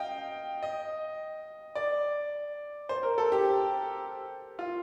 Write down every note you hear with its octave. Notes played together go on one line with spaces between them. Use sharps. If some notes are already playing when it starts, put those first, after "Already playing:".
Already playing: D#5 F5 G5
D#5
D5
C5
A#4
A4
G4
F4